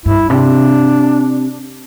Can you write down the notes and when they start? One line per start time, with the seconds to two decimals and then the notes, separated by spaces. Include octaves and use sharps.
0.05 G2 E4
0.29 C3 D4